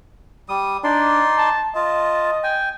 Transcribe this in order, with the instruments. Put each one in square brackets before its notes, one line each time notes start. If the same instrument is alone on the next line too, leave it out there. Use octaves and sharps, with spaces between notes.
[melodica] G3 D#6
[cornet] D4 [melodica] D#4 D5 C6
[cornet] A5
[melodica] F4 A5 [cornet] D#5
[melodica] G5 G#5